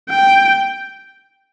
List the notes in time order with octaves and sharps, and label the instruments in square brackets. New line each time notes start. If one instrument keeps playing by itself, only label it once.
[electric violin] G5